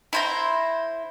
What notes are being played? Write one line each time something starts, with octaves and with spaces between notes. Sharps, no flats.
E4 C5 A#5